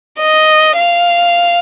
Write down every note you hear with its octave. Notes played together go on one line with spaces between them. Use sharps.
D#5
F5